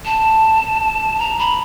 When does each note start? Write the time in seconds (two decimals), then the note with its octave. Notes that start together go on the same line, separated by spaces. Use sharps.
0.05 A5
1.19 A#5
1.39 B5